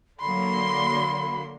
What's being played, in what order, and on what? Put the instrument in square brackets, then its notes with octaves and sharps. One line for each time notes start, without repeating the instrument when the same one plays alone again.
[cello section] D3 F#3 A#3 [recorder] B5 [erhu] C6